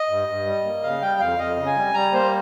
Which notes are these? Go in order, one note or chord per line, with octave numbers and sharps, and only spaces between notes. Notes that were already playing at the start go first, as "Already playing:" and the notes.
Already playing: D#5
G2
G2
G3
A#3
C#3 F5
G3 G5
F2 F5
F2 D#5
C#3
G#5
G3
G3 A#5
A#3 C5